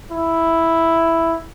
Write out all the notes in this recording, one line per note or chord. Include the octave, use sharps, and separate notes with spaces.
E4